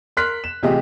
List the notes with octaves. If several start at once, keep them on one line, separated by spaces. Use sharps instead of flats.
A#4 C6 F6 F#6 B6
E7
A1 C3 F4 G4 G#4 D#5